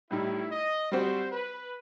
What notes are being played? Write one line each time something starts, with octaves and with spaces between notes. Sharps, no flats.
A2 G3 D#4 E4
D#5
G3 C4 F#4 C5
B4